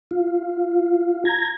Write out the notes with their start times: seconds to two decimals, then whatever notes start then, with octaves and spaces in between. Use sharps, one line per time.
0.11 F4
1.25 A#5 G#6